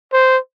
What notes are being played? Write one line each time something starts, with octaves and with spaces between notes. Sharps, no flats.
C5